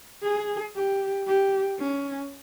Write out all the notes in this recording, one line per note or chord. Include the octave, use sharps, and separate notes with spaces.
G#4
G4
G4
C#4